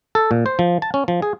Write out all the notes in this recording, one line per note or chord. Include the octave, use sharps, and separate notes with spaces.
A4
A#2
C5
F3
A5
C#4
F3
G#4